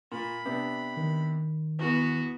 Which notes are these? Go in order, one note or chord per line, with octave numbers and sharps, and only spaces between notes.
A#2 B5
C3 B3 D4
D#3
E2 B3 F#4